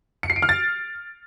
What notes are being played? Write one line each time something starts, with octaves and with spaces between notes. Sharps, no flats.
C#7
C7
D7
F6
A6